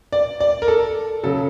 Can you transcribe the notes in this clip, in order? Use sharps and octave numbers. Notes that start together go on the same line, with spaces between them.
D5
D5
A#4
A4
C#3 F#3 A4